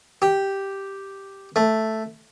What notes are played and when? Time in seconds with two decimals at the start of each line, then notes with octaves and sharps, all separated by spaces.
0.22 G4
1.56 A3